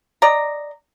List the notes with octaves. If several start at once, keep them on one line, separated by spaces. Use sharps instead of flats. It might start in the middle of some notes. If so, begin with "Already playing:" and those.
D5 D#5 A#5